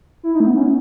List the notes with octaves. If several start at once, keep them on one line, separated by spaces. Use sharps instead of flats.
E4
D#4
A3
B3
C#4